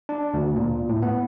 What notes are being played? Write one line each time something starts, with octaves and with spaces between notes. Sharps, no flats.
D4
D2
A#2
A2
B3